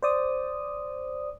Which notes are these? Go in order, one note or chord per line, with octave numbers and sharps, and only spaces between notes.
C5 D5 D#6